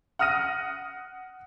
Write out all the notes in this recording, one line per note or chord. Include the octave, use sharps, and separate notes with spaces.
F#5 D#6 F6 A#6 D#7